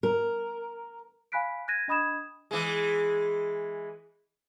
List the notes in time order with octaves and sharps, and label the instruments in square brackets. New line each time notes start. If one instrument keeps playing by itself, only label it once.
[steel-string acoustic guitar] A#4
[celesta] F5 G#5 B5 F#6 B6 D7
F#6 G#6 A#6 D#7
D4 D#5 B5 D#6 G#6 E7
[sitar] E3 G#3